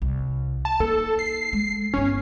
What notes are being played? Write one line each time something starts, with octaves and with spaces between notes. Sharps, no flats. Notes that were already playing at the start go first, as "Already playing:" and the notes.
C2
A5
A#3 D#4 A4
C7
G#3
G1 B3 C#4